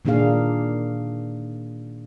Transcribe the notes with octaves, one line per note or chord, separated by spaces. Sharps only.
A#2 D#3 A#3 D4 G#4 F5